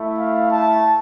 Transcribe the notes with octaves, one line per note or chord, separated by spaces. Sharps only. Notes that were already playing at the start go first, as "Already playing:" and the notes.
Already playing: A3 E4
F5
A5